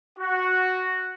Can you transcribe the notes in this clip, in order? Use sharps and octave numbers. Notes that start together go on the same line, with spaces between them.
F#4